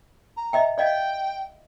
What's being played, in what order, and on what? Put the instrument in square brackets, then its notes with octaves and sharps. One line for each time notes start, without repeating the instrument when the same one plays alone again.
[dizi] A#5
[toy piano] D#5 E5 G5
[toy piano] D5 D#5 F5 [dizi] G5